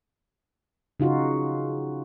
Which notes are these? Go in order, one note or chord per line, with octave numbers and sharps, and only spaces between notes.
C#3 D#4 F4 F#4